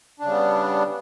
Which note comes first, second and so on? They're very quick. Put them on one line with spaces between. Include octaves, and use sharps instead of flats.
D4 C#3 G3 B3